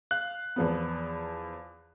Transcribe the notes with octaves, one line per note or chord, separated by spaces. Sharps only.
F5 F#6
E2 F3 B3